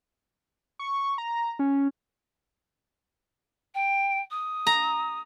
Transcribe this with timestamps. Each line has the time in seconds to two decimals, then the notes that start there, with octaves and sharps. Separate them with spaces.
0.79 C#6
1.18 A#5
1.59 C#4
3.74 G5
4.30 D#6
4.67 A#5